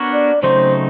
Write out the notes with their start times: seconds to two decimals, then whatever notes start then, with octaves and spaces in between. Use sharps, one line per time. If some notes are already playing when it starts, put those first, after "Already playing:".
Already playing: B3 D4 F#4 A#4 C#5
0.13 D5
0.43 C#3 F#3 A3 C4 D#4 C5